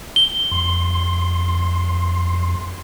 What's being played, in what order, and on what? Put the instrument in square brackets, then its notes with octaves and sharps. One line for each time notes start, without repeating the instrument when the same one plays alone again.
[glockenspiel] G7
[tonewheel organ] F2 C6